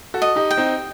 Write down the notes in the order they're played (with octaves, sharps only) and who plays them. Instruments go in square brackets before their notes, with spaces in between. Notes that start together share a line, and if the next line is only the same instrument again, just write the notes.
[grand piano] F#4 A4
[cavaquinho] D#5
[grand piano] D#4 G4
[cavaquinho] G5
[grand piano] C4 D#4